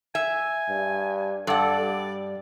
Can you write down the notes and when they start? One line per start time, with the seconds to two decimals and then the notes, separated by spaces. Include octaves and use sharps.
0.15 E5 G#5
0.69 G2
1.47 G2 A4 D5 F#5
1.80 G3